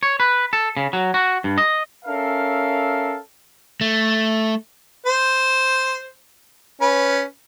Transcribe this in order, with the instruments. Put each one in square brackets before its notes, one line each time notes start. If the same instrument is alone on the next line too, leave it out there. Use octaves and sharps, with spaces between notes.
[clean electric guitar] C#5
B4
A4
C#3
F#3
F#4
G2
D#5
[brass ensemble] C#4 A4 A#4 E5 F5
[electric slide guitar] A3
[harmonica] C5
C#4 B4